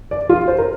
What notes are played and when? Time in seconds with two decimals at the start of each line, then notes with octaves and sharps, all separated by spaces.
0.11 D5
0.29 F4
0.48 C5
0.58 A#4